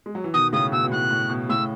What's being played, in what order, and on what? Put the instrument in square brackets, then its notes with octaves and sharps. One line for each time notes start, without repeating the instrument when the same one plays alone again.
[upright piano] G#3
F#3
E3
[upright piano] B2 D#3 [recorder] D#6
[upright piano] A2 C#3 [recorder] D#6
[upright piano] B2 [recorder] E6
[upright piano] B2
[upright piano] A2 [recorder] F#6
[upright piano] A2
B2
[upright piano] A2 C#3 [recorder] E6